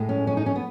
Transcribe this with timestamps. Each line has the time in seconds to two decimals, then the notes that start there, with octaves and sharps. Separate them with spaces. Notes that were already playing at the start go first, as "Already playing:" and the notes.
Already playing: A2 G#3
0.09 C#4
0.27 C#4
0.37 D#4
0.46 C#4
0.56 B3